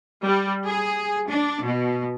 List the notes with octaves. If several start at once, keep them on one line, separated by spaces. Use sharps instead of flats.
G3
G#4
D4
B2